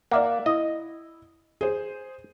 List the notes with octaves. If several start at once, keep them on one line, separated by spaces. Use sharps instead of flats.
A#3 D5 E5 F#5
E4 D#5
G#4 C5